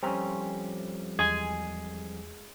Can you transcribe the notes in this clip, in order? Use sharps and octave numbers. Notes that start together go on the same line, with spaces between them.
F2 G3 C4 C#4 A#5
E2 G#3 G#4 G#5